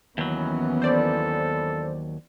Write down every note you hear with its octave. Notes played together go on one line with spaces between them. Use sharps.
D#2 E3 F#3 B3 C#4
A4 C5 D5